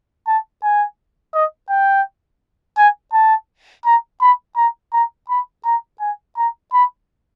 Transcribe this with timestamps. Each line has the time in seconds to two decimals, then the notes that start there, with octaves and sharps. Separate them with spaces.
0.27 A5
0.63 G#5
1.34 D#5
1.70 G5
2.77 G#5
3.13 A5
3.85 A#5
4.21 B5
4.57 A#5
4.93 A#5
5.30 B5
5.65 A#5
6.00 G#5
6.37 A#5
6.73 B5